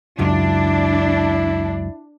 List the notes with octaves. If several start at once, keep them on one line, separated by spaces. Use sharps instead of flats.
C#2 F#2 D4 E4